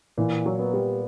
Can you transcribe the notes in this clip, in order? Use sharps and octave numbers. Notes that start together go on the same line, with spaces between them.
A#2 E3
F#3
B3
G3